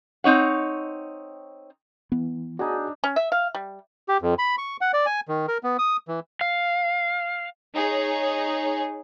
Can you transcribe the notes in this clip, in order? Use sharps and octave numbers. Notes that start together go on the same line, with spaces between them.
C4 D#4 C#5 F#5
E3 B3
D4 D#4 F#4 G#4 G#5
C#4
E5
F5
G3
G4
F2
B5
C#6
F#5
D5
G#5
D#3
A#4
B3
D#6
E3
F5
D#4 G#4 C#5